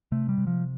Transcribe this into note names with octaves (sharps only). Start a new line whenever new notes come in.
C3 A3
G3
C3
F3